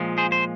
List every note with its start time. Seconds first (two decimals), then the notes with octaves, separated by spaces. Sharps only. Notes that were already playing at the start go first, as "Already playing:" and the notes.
Already playing: A#2 F3 G#3
0.18 G#4 C5
0.32 C5